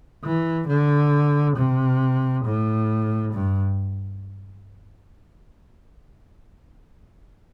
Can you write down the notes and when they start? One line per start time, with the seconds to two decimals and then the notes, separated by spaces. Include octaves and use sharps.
0.24 E3
0.68 D3
1.57 C3
2.45 A2
3.33 G2